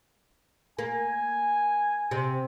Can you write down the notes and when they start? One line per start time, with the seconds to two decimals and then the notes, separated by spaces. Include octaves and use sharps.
0.79 A#3 G#5
2.11 C3